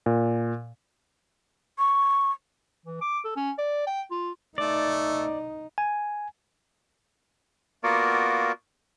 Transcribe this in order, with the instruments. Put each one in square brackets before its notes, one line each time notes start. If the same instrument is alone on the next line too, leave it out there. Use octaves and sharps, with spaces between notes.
[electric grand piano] A#2
[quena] C#6
[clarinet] E3
D6
A4
C#4
D5
G5
F4
[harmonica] A3 [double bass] D#4 [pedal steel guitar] D5
[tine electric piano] G#5
[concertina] A#3 B3 F4 F#4 A#4 D5